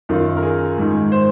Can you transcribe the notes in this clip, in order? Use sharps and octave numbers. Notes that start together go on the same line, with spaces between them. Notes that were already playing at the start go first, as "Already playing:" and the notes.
F#2 D#3 F4
A#4
G#4
G#2 D#3
C5